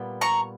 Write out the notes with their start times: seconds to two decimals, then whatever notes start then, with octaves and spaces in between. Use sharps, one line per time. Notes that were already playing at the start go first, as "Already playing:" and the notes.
Already playing: A#2 G3 B3
0.21 A#5 C#6